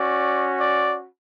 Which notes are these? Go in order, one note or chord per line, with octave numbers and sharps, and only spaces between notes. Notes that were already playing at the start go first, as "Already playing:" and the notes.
Already playing: C#4 F#4 D5
D5